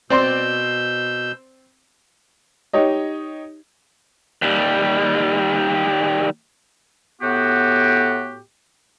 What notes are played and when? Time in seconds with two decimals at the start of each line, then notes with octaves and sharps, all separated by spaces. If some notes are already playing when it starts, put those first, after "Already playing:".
0.10 B2 C4 D5 C6 E6 G6
2.73 D#4 G4 C#5 D#5
4.42 D#2 G3
7.21 A2 B3 F#4 G4